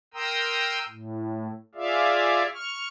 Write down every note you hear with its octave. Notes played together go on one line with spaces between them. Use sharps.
A#4 G5 A#5 C6 D#6 E6
A2
F4 G#4 D5 E5 F5
C#6 F6